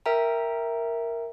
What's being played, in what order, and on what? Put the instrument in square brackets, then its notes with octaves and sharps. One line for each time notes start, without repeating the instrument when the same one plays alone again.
[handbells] A#4 E5 G5 A#5